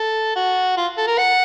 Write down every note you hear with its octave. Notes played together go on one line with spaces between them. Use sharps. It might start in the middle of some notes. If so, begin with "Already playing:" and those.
Already playing: A4
F#4
F4
A4
A#4
F#5